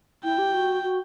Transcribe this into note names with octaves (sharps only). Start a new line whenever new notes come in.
E4 G5
G4
F#4
F#4